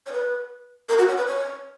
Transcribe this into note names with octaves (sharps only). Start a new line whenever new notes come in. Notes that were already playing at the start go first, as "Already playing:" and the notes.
C#5
B4
A#4
F#4
C#5
B4
C#5